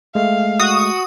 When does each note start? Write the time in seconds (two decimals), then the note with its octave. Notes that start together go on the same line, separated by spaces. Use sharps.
0.15 G#3 A3 F5
0.60 F#4 D#6